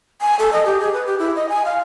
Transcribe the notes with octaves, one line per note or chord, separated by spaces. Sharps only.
G#5
A4
D#5
G4
G#4
B4
G4
E4
D#5
G#5
F5